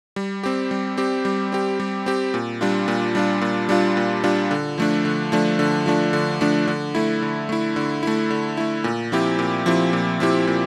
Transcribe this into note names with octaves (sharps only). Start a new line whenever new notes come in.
G3
C4 G4
G3
C4 G4
G3
C4 G4
G3
C4 G4
A#2
G3 D4 F4
A#2
G3 D4 F4
A#2
G3 D4 F4
A#2
G3 D4 F4
D3
F3 A3 D4
D3
F3 A3 D4
D3
F3 A3 D4
D3
F3 A3 D4
D3
A3 E4
D3
A3 E4
D3
A3 E4
D3
A3 E4
A#2
F3 C4 E4 G4
A#2
F3 C4 E4 G4
A#2
F3 C4 E4 G4
A#2